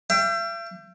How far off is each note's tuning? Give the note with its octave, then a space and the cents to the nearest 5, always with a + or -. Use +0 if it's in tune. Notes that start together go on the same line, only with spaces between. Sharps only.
E5 +45 G5 +0